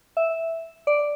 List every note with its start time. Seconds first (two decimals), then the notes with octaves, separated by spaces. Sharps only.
0.17 E5
0.87 D5